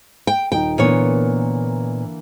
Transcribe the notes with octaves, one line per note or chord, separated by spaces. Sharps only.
G5
D#1 D#4 G5
A#2 D3 E3 A#3 B3 C#5